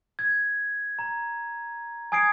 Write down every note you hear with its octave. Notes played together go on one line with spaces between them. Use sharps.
G#6
A#5
G#5 D#6 G#6 C7 D7